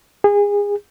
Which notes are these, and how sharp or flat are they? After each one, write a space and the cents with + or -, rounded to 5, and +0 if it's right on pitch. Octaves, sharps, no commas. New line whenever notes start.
G#4 -30